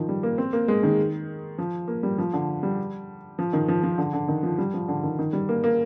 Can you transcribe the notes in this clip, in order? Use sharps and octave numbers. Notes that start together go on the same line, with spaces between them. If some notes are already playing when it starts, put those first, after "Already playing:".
Already playing: D#3 F3
G3
A#3
C4
A#3
G#3
D#3
F3
A#3
G3
F3
D3
G3
F3
D#3
F3
F3
D3
D3
D#3
F3
G3
F3
D3
D#3
D#3
G3
A#3
A#3